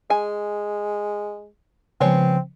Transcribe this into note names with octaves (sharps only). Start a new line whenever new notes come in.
G#3 G#5
C#3 F3 G#3 B3 C4 C#5